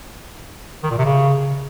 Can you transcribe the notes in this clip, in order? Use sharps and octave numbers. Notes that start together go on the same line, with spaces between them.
D#3
A#2
C3
C#3